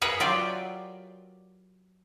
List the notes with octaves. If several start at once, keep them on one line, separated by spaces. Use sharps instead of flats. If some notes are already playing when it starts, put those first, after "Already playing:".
G#4 A#4 B4 C#5 G#5
F#3 F4 G4 D5 E5